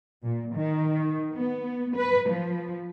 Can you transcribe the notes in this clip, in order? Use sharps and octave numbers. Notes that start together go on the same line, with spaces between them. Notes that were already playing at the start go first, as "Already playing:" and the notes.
A#2
D#3
B3
B4
F3